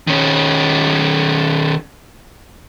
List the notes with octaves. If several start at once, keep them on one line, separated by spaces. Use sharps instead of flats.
D#3 C#4